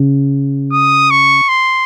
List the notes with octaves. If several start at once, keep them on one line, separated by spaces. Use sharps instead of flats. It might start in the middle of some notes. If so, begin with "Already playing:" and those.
Already playing: C#3
D#6
C#6
C6